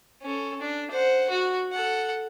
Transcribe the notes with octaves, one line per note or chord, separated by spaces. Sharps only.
C#4 A4
D4
C5 F#5
F#4
A4 F#5